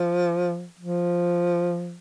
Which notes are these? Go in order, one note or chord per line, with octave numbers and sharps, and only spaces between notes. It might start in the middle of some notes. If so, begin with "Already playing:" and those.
Already playing: F3
F3